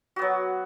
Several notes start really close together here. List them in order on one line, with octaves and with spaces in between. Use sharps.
F#4 B3 F#3